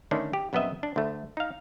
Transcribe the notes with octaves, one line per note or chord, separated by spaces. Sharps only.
D3 D#3 A3 C#4 D4
G4
A#1 F#2 B3 C4 D#5 E5
D4
D2 A3
D#4 F5